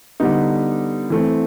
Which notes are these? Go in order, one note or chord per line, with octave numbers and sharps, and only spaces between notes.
D3 G3 B3 D#4
E3 A3 C4